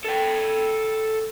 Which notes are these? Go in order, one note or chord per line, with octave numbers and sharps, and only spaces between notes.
A4 G5